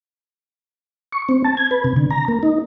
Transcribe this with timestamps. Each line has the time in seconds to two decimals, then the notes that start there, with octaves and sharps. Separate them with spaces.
1.12 C#6
1.29 C4
1.44 A5
1.57 G#6
1.71 B4
1.84 C3
1.96 D3
2.11 A#5
2.28 A#3
2.43 D#4